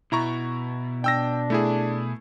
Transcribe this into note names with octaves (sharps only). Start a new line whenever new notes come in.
B2 E4 A#5 C#6
D4 G5 E6 A#6
A3 E4 G#4